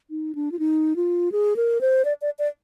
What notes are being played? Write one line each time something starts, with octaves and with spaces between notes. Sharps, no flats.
D#4
D4
F4
D#4
F4
G#4
A#4
C5
D5
D5
D5